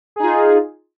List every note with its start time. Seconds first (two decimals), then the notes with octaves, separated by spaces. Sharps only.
0.16 G#4
0.20 D#4
0.23 F4